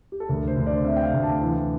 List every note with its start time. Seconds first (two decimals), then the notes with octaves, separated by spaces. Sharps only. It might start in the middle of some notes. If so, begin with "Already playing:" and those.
0.12 G4
0.20 A4
0.28 D2 A#4
0.47 C5
0.57 D2
0.66 D5
0.85 C3 E5
0.97 G5
1.04 F5
1.13 D2
1.23 A5
1.41 E3